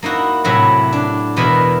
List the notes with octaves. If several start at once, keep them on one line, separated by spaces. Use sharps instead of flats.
A#3 D#4 E4 F#4
A2 C3 F#3 E4 F#4
D4
E2 B2 G#3 E4 A#4 F#5